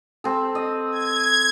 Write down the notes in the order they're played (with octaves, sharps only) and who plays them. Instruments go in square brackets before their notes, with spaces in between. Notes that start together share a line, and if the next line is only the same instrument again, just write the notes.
[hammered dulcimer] C4 A4
D#5
[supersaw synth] G#6